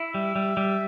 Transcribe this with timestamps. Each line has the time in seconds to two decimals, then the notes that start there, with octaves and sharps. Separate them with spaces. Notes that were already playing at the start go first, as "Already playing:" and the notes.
Already playing: E4 E5
0.14 G3
0.36 G3
0.57 G3